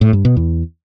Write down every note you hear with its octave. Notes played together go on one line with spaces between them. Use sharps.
A2
G2
B2
E2